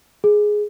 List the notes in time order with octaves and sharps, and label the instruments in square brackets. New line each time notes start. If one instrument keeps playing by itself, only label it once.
[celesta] G#4